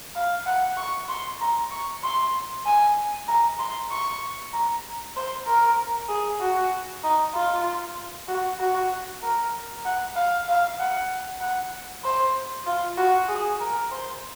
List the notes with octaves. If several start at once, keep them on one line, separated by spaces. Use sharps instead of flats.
F5
F#5
C#6
C6
A#5
C#6
C6
G#5
A#5
C6
C#6
A#5
C5
A#4
G#4
F#4
D#4
F4
F#4
F#4
A#4
F#5
F5
F5
F#5
F#5
C5
F4
F#4
G#4
A#4
C5